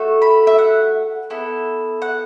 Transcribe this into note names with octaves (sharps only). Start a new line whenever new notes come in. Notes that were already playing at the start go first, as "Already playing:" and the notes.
Already playing: A3 F#4 A4
B5
E5
F#5
B3 E4 A4
F#5